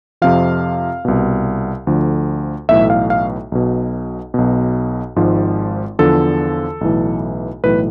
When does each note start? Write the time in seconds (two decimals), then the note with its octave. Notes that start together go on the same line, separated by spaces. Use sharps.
0.22 F2 C3 F3 F5
1.05 C2 B2
1.87 D2 D3 F3
2.69 B1 A2 E3 E5
2.90 F5
3.10 F5
3.52 B1 B2
4.34 B1 B2
5.16 G#1 G#2 F3
5.99 E2 D3 F3 A4
6.81 B1 A2 E3
7.63 B1 A2 E3 B4